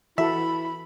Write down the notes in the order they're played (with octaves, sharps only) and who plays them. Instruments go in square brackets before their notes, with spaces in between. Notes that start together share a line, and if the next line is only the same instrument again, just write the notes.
[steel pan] E3 F#4 A4 [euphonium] E4 [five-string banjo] E5 [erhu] B5